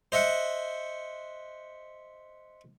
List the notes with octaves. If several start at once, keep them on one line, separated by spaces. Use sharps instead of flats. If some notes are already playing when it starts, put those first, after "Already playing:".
C5 D#5 E5 F#5